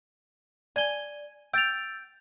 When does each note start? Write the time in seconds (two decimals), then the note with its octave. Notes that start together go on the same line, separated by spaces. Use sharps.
0.76 D5 G#5 G7
1.54 G5 E6 A6 F7